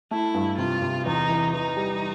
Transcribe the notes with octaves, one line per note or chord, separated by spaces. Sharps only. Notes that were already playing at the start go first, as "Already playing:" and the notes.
A3 E4
G2
C3 F4
C3
E2 D#4
E3
E3 D#4
G3